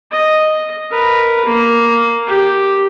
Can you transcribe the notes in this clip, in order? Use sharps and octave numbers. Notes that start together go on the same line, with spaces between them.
D#5
A#4 B4
A#3
G4